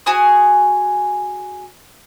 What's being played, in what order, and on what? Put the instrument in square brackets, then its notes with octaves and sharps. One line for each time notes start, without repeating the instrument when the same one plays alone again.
[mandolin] F#4 G#4 G#5 D#6